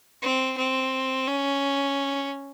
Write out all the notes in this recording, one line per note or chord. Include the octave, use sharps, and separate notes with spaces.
C4
C4
C#4